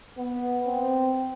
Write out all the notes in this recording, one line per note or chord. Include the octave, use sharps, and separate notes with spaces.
B3
C4